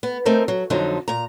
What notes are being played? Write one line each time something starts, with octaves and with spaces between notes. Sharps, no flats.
B3
A3 C4 D#4 A#4 C5
F#3
F2 D3 F3 F#3 D#4
A#2 A#5